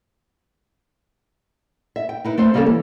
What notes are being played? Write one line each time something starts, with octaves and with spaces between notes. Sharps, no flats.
E5
G5
D#4 E4 B4
A3 C4 C5
C#3 G3 A#3 C4 C#4 A4
E3